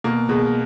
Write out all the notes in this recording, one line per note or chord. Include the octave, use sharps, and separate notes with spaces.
B2 A#3
B2 G#3